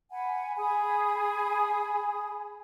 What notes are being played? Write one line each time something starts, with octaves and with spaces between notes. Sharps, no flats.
F#5 G#5 B5
G#4 G#5 B5 D#6